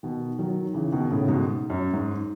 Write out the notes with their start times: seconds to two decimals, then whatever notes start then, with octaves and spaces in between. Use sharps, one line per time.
0.03 B2 D#3
0.39 D#3 F#3
0.74 C#3 E3
0.92 B2 D#3
1.11 A2 C#3
1.28 G#2 B2
1.70 F#2
1.94 G#2